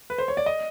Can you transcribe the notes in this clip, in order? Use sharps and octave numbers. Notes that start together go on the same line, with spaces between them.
B4
C5
C#5
D5
D#5